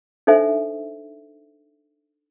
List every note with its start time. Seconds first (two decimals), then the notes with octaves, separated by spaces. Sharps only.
0.27 D4 D#4 A4 C5 E5 G#5